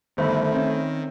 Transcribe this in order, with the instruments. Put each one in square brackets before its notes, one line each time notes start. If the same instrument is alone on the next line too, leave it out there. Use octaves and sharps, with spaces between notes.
[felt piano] G1 [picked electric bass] D#3 [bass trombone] A3 [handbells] C5 E5 B5
[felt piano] C4 C#4